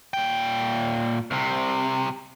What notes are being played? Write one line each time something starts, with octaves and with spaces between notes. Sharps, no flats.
A#2 G5
C2 C3